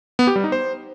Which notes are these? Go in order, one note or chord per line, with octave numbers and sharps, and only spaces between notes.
B3
G4
G3
D#4
C5